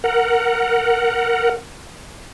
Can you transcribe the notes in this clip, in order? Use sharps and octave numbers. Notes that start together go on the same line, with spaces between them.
A#4 F#5